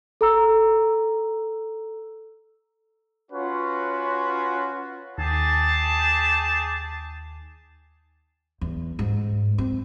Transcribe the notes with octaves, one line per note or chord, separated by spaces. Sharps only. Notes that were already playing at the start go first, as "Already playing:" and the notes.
A4 A#5 E6
C#4 F4 F#4 B4 C#5 F#5
D#2 G4 G#4 A5
E2
G#2
C4